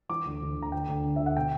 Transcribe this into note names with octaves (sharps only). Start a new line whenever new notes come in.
E3 D6
D2
D2
D2
A#5
D2 G5
D2
D3
D2 E5
F#5
B2 G5